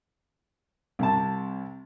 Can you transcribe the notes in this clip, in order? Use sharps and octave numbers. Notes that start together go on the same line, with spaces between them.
C2 C3 A5